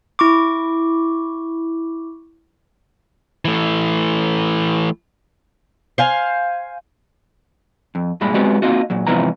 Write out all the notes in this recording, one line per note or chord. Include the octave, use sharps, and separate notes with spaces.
E4 C#6 D6
E3 A3
C5 F5 G#5
F2
G2 A#2 G#3 B5
G#3 B3 C4 F#4 G4
A#3 C4 D#4 F4 F#4
A#2 F#3
G#2 C3 E3 F3 B3 A#5